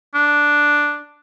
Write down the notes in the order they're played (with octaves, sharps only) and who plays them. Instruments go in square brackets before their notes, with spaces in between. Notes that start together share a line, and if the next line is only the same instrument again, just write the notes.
[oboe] D4